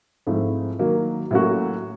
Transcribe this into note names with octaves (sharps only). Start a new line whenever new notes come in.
G#2 F3 A3 C4 E4
D#3 F#3 A#3
A2 F#3 A#3 C#4 F#4